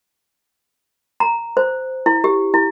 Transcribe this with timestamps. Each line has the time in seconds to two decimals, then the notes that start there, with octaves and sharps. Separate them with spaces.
1.20 A#5
1.57 C5
2.06 E4
2.24 G4
2.54 E4